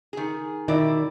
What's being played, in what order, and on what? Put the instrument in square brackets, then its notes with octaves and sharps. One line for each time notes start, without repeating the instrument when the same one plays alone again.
[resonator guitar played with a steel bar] D#3 G#4
[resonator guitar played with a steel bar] B2 E4 D5 [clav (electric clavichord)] D#3